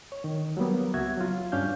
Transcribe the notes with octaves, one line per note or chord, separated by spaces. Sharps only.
C#5
D#3
F#3 G3 A#3 B3
C#2 F#4 E5 G#6
F#3 F4
G2 C#4 D4 F5 G6